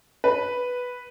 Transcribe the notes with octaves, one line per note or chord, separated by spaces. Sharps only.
B4